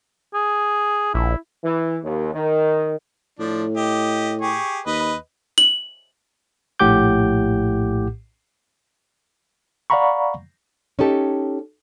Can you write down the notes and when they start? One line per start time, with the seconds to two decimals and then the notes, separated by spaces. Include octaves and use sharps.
0.34 G#4
1.14 A#1 E4
1.64 E3
2.03 D#2
2.34 D#3
3.39 A2 F3 D4
3.77 G4 D#5
4.41 G4 G#4 C#6
4.86 D#2 B4 D#5
5.58 F#7
6.80 A#1 A2 G4 F#5 D6 G6
9.90 D5 F5 F#5 A#5 B5 C#6
10.99 C#4 D#4 G4 A4